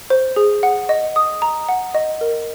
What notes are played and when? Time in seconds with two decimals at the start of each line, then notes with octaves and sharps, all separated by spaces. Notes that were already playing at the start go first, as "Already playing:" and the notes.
0.10 C5
0.36 G#4
0.63 F#5
0.89 D#5
1.16 D#6
1.42 A#5
1.69 F#5
1.94 D#5
2.21 A#4